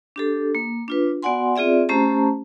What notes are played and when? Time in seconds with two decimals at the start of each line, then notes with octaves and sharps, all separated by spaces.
0.16 D4 G4 A4
0.55 A#3
0.88 D4 F4 B4
1.23 B3 F#4 D5 F#5 G#5 C6
1.56 C4 F4 G#4 D5 E5
1.89 A3 C#4 G4 C5 A5 A#5